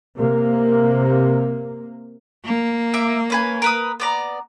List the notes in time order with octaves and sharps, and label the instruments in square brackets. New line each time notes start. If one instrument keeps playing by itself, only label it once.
[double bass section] C3 A#3
[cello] A#3
[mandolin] E5 D6
C#4 B4 G#5
A#4 B4 D#6
B3 D5 A#5